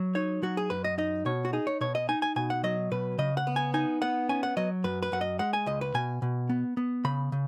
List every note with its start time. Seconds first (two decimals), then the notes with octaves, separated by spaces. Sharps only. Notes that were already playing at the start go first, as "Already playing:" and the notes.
Already playing: F#3
0.15 D#4 C#5
0.42 F#3 F#4
0.57 G#4
0.70 F#2 B4
0.84 D#5
0.98 D#4 D#5
1.26 B2 C#5
1.45 F#4
1.53 D#4 G#4
1.67 C#5
1.81 B2 C#5
1.95 D#5
2.09 D#4 G#5
2.22 G#5
2.36 B2 G#5
2.50 F#5
2.64 F#3 D#5
2.91 B2 B4
3.18 C#3 D#5
3.37 F#5
3.47 B3
3.56 G#5
3.74 D#4 G#5
4.02 B3 F#5
4.29 C#4 G#5
4.43 F#5
4.57 F#3 D#5
4.84 F#2 B4
5.02 B4
5.12 F#2 F#5
5.21 D#5
5.39 G#3 F#5
5.53 G#5
5.66 C#2 D#5
5.81 B4
5.94 B2 G#5
6.22 B2
6.49 B3
6.77 B3
7.04 C#3 B5
7.32 C#3